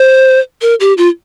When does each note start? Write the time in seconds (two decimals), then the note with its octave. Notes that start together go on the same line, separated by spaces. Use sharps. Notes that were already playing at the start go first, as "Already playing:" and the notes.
Already playing: C5
0.62 A#4
0.80 G4
0.98 F4